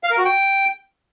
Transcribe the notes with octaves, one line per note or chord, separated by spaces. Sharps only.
F5
A#4
F#4
G5